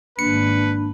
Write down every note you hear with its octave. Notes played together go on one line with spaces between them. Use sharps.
G#1 A#3 D4 B4 C#7